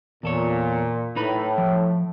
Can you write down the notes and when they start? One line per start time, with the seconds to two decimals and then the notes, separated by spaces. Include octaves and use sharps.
0.23 E2 A#2 A4 C#5
1.16 A2 D#4 B4 B5
1.58 F3